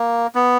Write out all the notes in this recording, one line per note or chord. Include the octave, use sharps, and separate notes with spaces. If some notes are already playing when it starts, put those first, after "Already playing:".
Already playing: A#3
B3